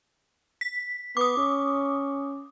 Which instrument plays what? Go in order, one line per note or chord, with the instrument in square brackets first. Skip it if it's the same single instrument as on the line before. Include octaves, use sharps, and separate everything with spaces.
[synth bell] B6
[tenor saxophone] B3 [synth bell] D6 D#6
[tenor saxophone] C#4